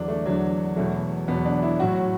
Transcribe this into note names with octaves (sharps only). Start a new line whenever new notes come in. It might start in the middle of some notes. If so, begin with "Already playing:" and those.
Already playing: E2 D3 F#3 D4
A3
E2 D3 F#3
E2 B2 F#3 A3
E2 B2 F#3 B3
D4
E4
A2 F#3 F#4